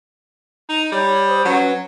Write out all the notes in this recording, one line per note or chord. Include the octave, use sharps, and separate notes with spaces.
D#4
G3 C#5
C5 D#6
F#3 C#4 B4